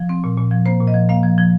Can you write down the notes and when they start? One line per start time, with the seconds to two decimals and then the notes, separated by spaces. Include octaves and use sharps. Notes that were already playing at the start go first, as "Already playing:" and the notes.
Already playing: F3
0.09 C4
0.24 A#2
0.37 A#2
0.51 F3
0.66 A#3 C5
0.80 A#2
0.87 D#5
0.94 F3
1.09 A#3 F5
1.23 F3
1.38 F3